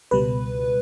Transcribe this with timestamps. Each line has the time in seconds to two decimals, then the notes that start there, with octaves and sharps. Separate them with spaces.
0.11 C#2 B2 G3 B4